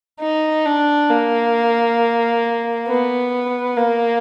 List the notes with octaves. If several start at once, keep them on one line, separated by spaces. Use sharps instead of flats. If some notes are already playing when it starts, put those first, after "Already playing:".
D#4
D4
A#3
B3
A#3